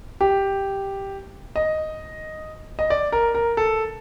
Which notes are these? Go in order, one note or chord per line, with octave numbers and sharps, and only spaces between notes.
G4
D#5
D#5
D5
A#4
A#4
A4